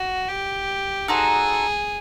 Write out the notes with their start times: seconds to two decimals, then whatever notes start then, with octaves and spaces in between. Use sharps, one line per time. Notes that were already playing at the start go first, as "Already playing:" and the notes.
Already playing: F#4
0.28 G4
1.08 D#4 F#4 G#4 A4 C5